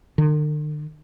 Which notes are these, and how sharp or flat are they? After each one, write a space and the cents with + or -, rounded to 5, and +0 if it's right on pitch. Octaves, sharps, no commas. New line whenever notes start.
D3 +45